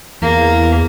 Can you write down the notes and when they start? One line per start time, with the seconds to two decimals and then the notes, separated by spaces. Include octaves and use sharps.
0.22 E2 A#3